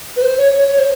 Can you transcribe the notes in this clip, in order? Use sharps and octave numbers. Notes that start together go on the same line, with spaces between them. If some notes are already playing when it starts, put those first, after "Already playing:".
B4
C5
C#5
C#5
C#5
C5